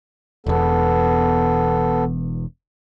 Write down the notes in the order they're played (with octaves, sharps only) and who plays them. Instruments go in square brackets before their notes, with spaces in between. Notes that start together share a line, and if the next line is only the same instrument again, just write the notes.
[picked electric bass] E1 E2 [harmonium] B3 A4